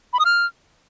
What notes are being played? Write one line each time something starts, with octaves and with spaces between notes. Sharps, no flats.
B5
D#6
F6